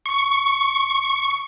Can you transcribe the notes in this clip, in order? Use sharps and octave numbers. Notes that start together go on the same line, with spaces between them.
C#6